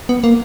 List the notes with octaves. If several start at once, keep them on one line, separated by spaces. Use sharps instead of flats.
B3
A#3